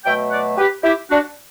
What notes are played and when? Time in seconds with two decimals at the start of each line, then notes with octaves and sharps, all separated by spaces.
0.04 B2 F#3 A3 E5 G5
0.31 D5 F#5
0.57 G4 B4
0.84 E4 G4
1.10 D4 F#4